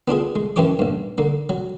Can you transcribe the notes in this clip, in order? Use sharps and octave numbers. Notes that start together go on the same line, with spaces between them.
B3 D4 F4 G#4
G#3
F#2 E3 C#4 G4 C#5 D6
A#1 G2
D3 A#3
F#3